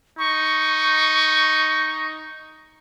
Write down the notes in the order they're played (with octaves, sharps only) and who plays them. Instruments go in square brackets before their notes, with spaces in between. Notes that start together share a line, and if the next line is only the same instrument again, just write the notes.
[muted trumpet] D#4 [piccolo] C#6